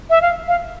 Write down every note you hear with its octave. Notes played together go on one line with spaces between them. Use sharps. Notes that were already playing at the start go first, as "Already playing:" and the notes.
E5
F5
F5